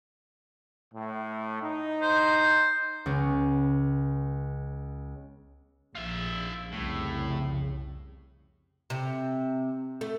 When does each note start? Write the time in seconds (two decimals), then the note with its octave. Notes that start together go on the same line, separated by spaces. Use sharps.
0.93 A2
1.62 D#4
2.02 C5
3.06 C#2 B3
5.95 A#1 F4 E5
6.72 C2 F2 A2 C#3
8.90 C3
10.01 A3